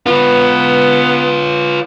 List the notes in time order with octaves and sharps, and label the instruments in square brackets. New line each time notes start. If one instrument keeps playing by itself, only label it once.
[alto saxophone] B3 [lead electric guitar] F4 B4